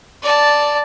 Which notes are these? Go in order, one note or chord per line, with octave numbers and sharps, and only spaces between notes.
D5 A5